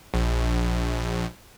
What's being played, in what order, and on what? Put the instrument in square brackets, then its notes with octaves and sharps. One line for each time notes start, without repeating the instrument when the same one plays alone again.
[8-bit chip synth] A#1